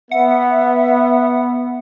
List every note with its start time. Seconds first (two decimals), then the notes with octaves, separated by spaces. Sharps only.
0.11 B3 E5 F#5